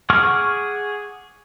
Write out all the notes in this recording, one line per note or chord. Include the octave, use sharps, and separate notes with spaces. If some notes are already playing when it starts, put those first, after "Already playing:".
G#4 F#5 C#6 D6 F6